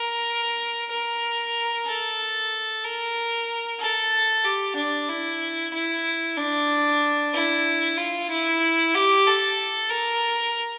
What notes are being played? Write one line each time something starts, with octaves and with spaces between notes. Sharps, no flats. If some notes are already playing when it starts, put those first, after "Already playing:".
Already playing: A#4
A#4
A4
A#4
A4
G4
D4
E4
E4
D4
E4
F4
E4
G4
A4
A#4